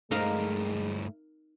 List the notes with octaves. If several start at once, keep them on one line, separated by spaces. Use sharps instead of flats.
G2 G#3 A3 D#4 A#4 F5